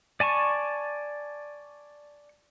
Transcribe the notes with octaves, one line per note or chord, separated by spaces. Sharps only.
D5 G#5 A5 C#6